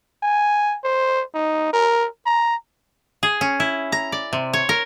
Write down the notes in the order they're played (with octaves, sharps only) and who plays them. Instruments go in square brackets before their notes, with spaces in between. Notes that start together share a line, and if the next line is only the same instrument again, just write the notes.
[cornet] G#5
C5
D#4
A#4
A#5
[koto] G#4
C#4
E4
A#5
D5
C3
C#5
A#4